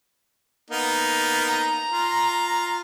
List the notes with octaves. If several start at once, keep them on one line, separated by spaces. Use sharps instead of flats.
A#3 B3 D#4
A#5
F4